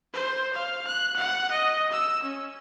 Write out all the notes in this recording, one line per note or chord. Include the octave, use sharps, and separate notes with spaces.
C5
F5
F#6
F#5
D#5
E6
C#4